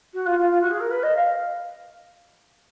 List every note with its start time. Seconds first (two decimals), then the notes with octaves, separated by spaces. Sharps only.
0.13 F#4
0.26 F4
0.38 F4
0.51 F4
0.61 F#4
0.70 G#4
0.80 A#4
0.90 B4
1.03 D#5
1.16 F5